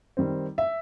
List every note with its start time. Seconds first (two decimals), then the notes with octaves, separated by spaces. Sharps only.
0.17 D#3 G3 C4
0.58 E5